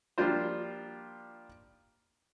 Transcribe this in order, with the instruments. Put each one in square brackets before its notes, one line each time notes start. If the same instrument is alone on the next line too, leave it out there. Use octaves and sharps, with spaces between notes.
[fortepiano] F3 G3 A#3 D4 F4 C5